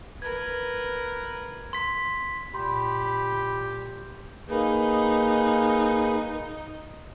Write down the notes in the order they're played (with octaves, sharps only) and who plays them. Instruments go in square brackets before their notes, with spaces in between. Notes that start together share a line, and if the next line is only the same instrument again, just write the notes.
[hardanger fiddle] A#4 B4 [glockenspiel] G#6
[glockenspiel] C6 B6
[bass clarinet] A#2 [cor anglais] G4 [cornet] B5 [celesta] C6
[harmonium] A#3 G#4 B4 [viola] D#4